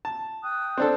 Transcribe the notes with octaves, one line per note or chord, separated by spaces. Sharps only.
A5
G5 D#6 F#6
C4 D4 A4